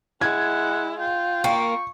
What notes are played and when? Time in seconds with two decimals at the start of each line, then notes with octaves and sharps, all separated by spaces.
0.21 G#3 E4 F#5 G#6
0.99 F4 G5
1.44 A#3 G5 C#6